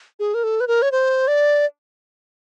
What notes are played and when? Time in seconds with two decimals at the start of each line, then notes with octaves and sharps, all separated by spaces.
0.20 G#4
0.34 A#4
0.44 A4
0.60 B4
0.68 A#4
0.82 C#5
0.92 C5
1.28 D5